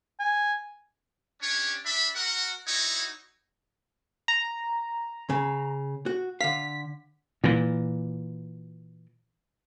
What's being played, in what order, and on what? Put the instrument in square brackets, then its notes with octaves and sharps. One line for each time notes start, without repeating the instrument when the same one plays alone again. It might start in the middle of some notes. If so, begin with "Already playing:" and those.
[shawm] G#5
[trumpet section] C#4 D4 G4 C#5
D4 E5 B5
F#4 A#4 F#5
D#4 E4 F#4 C#5
[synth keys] A#5
[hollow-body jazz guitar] C#3
F#4
[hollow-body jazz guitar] D3 F5 [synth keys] B6
[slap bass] A#2 E3